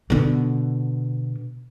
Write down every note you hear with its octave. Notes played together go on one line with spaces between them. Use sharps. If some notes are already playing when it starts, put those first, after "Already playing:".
B2 D3